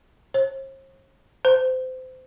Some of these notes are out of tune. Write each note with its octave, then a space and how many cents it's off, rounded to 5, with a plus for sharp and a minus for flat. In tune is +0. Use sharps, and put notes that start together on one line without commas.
C5 +45
C5 -25